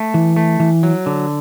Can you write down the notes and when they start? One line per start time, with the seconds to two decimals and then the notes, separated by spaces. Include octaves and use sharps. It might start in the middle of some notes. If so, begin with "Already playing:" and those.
Already playing: A3
0.14 E3
0.36 A3
0.60 E3
0.83 F#3
1.06 D3